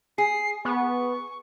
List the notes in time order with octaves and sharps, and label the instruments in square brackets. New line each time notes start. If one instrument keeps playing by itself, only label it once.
[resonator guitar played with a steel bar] G#4 [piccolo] C7
[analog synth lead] B3 [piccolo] C#6